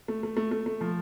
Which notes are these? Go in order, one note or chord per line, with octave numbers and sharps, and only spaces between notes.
A3
A3
A3
A3
A3
F3